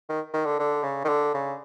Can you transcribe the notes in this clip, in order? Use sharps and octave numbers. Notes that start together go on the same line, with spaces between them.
D#3
D#3
D3
D3
C#3
D#3
D3
C#3